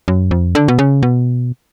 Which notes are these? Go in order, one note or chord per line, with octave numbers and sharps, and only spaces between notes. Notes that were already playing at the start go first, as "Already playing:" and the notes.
F#2
F2
D3
B2
C#3
B2